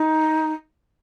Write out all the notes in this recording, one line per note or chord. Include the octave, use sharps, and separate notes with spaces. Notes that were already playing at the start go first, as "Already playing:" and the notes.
Already playing: D#4